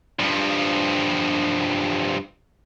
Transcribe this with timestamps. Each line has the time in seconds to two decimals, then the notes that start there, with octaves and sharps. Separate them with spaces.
0.20 G2 F3